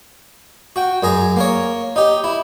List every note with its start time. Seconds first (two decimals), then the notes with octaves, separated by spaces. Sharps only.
0.76 F#4 G5
1.03 F#2 G#4 A#5
1.36 A#3 A#4 C#5
1.96 D#4 G4
2.24 E4